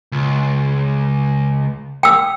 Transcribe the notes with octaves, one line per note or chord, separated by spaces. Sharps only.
C#2
G5 E6